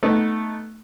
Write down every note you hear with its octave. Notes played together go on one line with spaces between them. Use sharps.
A3 B3 D#4